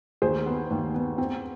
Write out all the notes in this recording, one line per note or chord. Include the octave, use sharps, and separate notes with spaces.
D#2 G#4 C5
B3
D#2
B3
C4